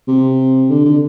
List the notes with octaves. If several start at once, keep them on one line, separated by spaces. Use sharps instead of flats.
C3
D3
D3